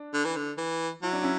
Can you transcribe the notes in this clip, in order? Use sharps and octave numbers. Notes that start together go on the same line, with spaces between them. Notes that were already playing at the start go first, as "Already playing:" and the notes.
Already playing: D4
D3
E3
D3
E3
F#3 E4
D4
C#4 E4